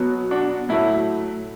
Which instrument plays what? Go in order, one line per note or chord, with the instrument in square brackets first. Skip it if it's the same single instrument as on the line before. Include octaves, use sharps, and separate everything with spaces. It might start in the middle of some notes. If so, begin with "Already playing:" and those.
Already playing: [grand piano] B2 F#3 B3
D4 F#4
A2 F#3 A3 E4